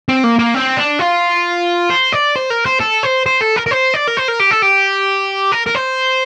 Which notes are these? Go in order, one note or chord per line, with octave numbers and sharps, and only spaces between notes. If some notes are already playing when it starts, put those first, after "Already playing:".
C4
A#3
A#3
C4
D4
F4
C5
D5
C5
A#4
C5
A4
C5
C5
A4
A#4
A#4
C5
D5
A#4
C5
A#4
G4
A4
G4
A#4
A#4
C5